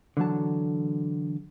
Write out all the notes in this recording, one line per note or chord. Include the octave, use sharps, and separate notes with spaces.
D3 E3 F#3 A5